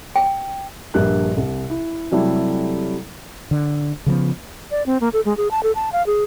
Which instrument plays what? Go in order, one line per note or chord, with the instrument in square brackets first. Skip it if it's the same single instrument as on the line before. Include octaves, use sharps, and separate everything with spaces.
[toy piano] G5
[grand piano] A#1 G2 A#4 F#6
C2
E4
C3 F#3 G3 A3 E4 A4
[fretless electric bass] D3
C#3 F3 A3 B3
[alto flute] D5
C4
A#3
A4
G#3
G#4
A5
A4
A5
F5
G#4